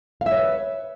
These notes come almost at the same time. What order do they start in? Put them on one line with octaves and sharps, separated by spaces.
F5 E5 C#5 B4